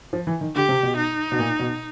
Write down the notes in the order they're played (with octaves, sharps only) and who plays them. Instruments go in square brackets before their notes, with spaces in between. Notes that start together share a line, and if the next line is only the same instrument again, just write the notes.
[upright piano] F3
E3
D#3
[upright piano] D3 [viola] G4
[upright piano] C3
B2
[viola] D#4
[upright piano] B2
A#2
B2